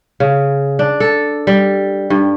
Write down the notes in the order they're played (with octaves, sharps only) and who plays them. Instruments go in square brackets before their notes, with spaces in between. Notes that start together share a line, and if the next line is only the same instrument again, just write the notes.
[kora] C#3
D4
A4
G3
G2